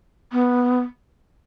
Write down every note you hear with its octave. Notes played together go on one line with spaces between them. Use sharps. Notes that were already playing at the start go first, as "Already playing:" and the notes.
B3